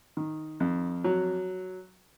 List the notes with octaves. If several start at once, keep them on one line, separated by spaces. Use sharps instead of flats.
D#3
F2
F#3